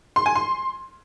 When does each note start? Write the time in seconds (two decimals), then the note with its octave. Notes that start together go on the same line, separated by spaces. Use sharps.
0.16 C6
0.26 G#5
0.36 C6